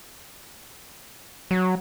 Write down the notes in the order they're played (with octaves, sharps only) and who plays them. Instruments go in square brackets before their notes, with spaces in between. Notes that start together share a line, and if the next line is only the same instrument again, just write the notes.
[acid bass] F#3